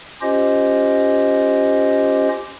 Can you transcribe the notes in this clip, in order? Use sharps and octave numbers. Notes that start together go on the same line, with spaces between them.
C#4 F4 G4 C5 D#5